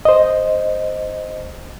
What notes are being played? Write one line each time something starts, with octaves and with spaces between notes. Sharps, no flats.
C5 D#5